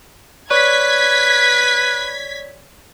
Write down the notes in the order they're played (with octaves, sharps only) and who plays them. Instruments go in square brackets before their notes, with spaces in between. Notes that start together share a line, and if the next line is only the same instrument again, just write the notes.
[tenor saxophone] B4 [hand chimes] C#5 D5 C#6 [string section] G#6 B6